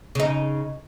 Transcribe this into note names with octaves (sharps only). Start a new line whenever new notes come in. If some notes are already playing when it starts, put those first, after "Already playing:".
C#3 D#4